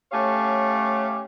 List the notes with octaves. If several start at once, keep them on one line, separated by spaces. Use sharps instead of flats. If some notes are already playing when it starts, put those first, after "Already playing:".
A3 C#4 G4 C#5 F5